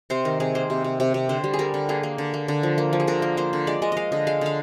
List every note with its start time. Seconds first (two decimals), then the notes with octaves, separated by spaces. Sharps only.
0.10 C3 C5
0.25 D#3 A#4
0.40 C3 G#4
0.55 A#3 C5
0.70 C3
0.84 C3
1.00 C3
1.14 C3
1.29 D3 C5
1.44 G3
1.54 G#4
1.59 G3 A#4
1.74 D3
1.89 A#3 G#4
2.03 A#3
2.18 D3
2.34 A#3
2.48 D3
2.63 F3
2.78 A#3
2.93 F3
3.00 G#4
3.07 D3 A#4
3.22 A#3
3.37 A#3 C5
3.53 D3
3.67 G#3 D5
3.82 G#3 D#5
3.92 G#3 D#5 F5
4.12 D3 D#5
4.27 G#3 F5
4.41 D3 F5